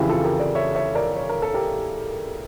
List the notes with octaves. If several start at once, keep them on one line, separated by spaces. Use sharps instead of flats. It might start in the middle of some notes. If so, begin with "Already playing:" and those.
Already playing: F2 C#3 E3 E4 G4
F4 A4
G4 A#4
A#4 D5
C#5 E5
C#5 E5
A#4 D5
C#5
A#4
A4
G4 A#4